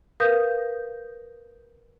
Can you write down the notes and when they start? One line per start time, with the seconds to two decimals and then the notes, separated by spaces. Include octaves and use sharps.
0.20 A#4 B4 F5 D#6 G6